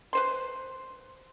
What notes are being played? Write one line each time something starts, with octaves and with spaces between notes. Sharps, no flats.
B4 C5 C6